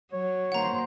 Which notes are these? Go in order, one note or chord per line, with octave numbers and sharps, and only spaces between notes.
F#3 C#5
D#3 A#3 C5 F#5 A#5